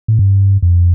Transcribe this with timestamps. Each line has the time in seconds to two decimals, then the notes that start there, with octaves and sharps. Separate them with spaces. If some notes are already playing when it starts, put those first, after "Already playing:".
0.08 A2
0.19 G2
0.63 F2